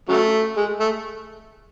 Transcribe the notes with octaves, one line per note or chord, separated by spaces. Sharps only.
C#3 F#3 A3
G#3
A3